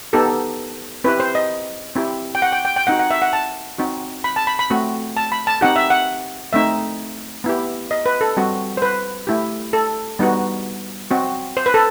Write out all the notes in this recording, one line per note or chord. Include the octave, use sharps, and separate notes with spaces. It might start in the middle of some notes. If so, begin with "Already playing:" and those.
B3 D#4 G4 A4
C4 E4 G4 B4
C5
D#5
C4 E4 G4
G5
F#5
G5
G5
G5
C4 D#4 F#4 F#5
F#5
E5
F#5
A5
C4 D#4 F#4
B5
A5
B5
B5
A3 C4 F#4
A5
B5
A5
C4 D#4 G4 F#5
E5
F#5
A3 C4 D#4 E5
B3 E4 G4
D#5
B4
A4
G3 C4 F#4
C5
B4
A3 E4 G4
A4
G3 B3 D#4 F#4
C4 F#4
C5
B4
A4